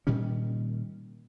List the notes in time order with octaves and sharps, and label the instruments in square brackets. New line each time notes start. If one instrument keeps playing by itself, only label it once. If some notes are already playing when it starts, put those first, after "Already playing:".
[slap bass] A#2 D#3 G3 C#4